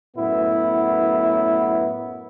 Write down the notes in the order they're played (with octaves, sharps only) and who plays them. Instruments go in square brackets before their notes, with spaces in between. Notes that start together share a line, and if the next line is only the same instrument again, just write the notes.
[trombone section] F#2 A2 B3 E4